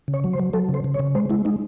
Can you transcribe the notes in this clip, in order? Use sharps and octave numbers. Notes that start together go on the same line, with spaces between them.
C#3
C#5
F#3
C5
F#3
F#3 A4
C#3
C5
C#3
C#5
C#3
G#3 C5
G#3 E4
G#3 D#4